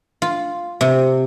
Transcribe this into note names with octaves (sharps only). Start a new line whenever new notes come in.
F4
C3